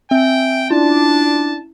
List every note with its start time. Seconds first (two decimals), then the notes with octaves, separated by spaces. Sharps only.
0.11 C4 E5 G5 G#5
0.71 C#4 D4 E4 F4 A5